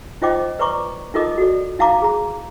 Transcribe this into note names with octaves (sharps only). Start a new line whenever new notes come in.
D#4 F4 C5 D#5 G5 D6
B4 D5 A#5 C#6 D6
D#4 F4 A4 A#4 D#5 D6
F#4 A4 D5
D#4 E4 F5 A5 A#5 D6
G#4 A#5